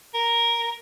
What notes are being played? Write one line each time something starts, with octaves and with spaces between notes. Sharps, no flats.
A#4